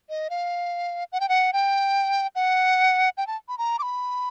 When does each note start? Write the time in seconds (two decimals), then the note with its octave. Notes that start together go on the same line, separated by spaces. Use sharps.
0.09 D#5
0.30 F5
1.12 F#5
1.20 G5
1.29 F#5
1.53 G5
2.35 F#5
3.18 G5
3.27 A5
3.48 B5
3.58 A#5
3.79 D6
3.82 B5